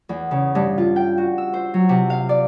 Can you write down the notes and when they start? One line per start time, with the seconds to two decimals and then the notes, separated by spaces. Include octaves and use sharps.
0.09 E2
0.31 C#3
0.55 G2
0.78 F4
0.96 G5
1.18 F#4
1.38 E6
1.54 C5
1.74 F#3
1.89 C3
2.10 F5
2.29 D5